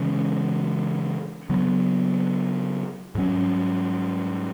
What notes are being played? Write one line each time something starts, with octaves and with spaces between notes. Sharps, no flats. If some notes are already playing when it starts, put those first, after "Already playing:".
Already playing: C#3 E3 G#3 C#4
C#3 F#3 B3
G#2 F#3 C#4